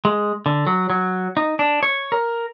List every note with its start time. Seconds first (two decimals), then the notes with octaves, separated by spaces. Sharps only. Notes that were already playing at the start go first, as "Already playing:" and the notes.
0.05 G#3
0.46 D3
0.67 F#3
0.90 F#3
1.37 D#4
1.59 D4
1.83 C#5
2.12 A#4